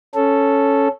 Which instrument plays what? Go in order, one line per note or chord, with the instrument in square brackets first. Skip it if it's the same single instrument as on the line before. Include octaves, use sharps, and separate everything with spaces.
[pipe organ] C#4 A4